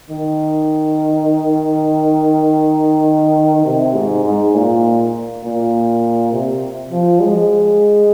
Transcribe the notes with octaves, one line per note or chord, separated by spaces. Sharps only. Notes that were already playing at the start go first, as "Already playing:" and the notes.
D#3
C3
G#2
G#2
A#2
A#2
C3
F3
G#3